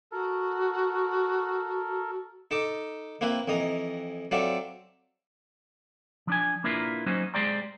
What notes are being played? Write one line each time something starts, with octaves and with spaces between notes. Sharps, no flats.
F#4 A4 A#4
D#4 A4 A5 D6
A#3 C4 E4 B4
F2 E3 D#5 A#5
F#3 C4 F4 A4 D5 E5
F3 D4 G#5
A#3 D4 E4 F4 A#4 B4
F#3 A#3 C#4 D#4 F#4 C5
G#3 G4 C5 D5 G5 A#5